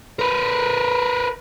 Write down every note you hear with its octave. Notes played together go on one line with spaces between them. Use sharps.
A#4 B4